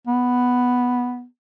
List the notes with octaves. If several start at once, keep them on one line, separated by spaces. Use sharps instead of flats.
B3